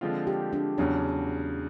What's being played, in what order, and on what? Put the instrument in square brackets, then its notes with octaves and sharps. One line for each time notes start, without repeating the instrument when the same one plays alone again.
[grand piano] D3 F3 G#3 C4 F4
[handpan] G4
D4
[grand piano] E2 C#3 F#3 [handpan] D4